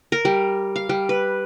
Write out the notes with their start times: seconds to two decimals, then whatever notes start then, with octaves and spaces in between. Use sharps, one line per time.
0.12 A#4
0.25 G3
0.76 F5
0.89 G3
1.09 B4